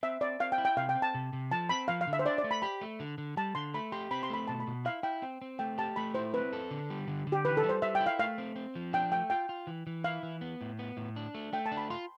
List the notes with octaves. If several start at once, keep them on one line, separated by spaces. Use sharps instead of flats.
C4 E5
C4 D5
C4 F5
G5
E4
G5
C3 F5
G5
C4
A5
C3
C3
F3 A5
C4 B5
F3 F5
F5
D3
E5
C5
D4 D5
D5
A3
B5
G4 B5
A3
D3
D3
G3 A5
D3 C6
A3 B5
G4 C6
C4 B5
C6
A3 B5
B2 A5
B5
B2
E4 F5
E4 G5
C4 G5
C4
A3 G5
G4 A5
A3 B5
E4 C5
C4 B4
A4
D3
G3
D3
D3
G4
E3 B4
A4
G3
C5
G3 E5
G5
E4
F5
A3 F5
C4
C4
F3
D4 G5
A3 G5
F4 G5
F4
E3
E3
E4 F5
E3
B3
A2
B3
A2
D4
A3
A3 G5
A5
D4
B5
F4 C6